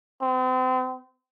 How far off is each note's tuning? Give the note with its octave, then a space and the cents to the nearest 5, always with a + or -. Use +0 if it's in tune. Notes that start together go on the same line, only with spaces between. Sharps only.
C4 -40